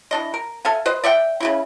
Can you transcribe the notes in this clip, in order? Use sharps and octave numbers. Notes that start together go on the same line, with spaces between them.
E3 D4 D#5
A#4
A4 E5 F5 G#5
B4 C5 D#5
D5 E5 F#5 G5
C#3 G3 E4